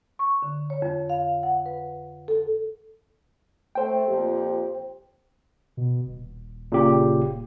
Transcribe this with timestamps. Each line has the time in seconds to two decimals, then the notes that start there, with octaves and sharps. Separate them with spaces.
0.19 C#6
0.42 D3
0.70 C#5
0.82 F2
1.10 F5
1.43 F#5
1.66 B4
2.28 A4
3.75 A3 C5 G5
4.06 F2 A#2 G4
5.77 B2
6.06 D#1
6.72 A#2 C#3 G4